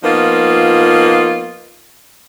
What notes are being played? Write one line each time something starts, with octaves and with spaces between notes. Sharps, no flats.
F3 A#3 B3 D#4 F4